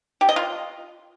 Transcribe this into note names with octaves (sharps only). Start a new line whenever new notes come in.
G4
D#5
F4